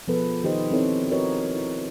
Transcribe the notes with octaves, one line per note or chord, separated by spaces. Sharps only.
B2 F3 B3 G#4 A4 B4
D#3 D#4 G4 B4 C5 D#5
C4 D#4 E4 A4 C5 C#5
F#4 A#4 B4 C#5 D#5
E4